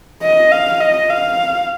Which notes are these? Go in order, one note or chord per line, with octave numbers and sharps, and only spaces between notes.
D#5
F5
D#5
F5